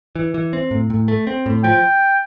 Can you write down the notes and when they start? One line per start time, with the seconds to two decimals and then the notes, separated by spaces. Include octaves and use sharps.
0.16 E3
0.34 E3
0.53 C4
0.71 A2
0.90 A2
1.08 A3
1.27 C4
1.46 A2
1.63 F3 G5